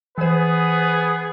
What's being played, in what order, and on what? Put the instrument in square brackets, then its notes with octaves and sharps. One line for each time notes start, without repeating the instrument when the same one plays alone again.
[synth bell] E3 C5 [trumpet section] B3 G#4 B4